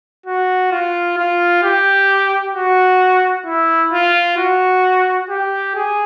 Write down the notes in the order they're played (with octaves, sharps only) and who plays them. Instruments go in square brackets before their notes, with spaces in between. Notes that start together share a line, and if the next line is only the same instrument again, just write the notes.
[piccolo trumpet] F#4
F4
F4
G4
F#4
E4
F4
F#4
G4
G#4